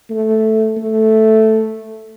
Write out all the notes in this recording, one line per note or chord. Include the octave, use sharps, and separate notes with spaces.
A3
A3